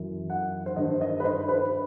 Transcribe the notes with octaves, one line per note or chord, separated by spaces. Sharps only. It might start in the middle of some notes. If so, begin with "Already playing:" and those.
Already playing: F#2 E3
F#5
C5
G2 D#3 D#5
D#5
B4
C5
B4